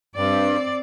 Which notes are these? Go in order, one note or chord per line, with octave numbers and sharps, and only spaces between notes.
G2 C4 D5